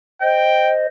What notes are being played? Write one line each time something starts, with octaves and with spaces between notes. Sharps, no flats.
C5 D#5 G5